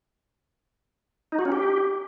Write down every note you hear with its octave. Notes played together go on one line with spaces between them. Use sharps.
D#4
F#4
C#4
G4